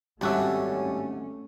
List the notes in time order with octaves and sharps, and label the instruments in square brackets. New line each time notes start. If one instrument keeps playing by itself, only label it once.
[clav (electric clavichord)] G#1 F#4 E5 [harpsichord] G3 D4 [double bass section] A3 C#4